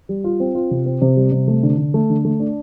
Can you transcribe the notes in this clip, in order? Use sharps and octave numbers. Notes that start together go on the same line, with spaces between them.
G3
F4
C4
F4
C3
C4
C3
G3
C3
A3
D3
D3
A3
D3
A3
D4